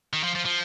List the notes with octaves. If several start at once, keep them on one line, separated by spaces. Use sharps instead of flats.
D#3
F3
F3
F3